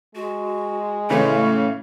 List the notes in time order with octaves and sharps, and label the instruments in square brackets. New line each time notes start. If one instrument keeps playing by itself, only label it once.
[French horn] G#3 [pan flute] F#4
[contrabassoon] A2 [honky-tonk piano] C#3 E3 C#4 [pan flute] A3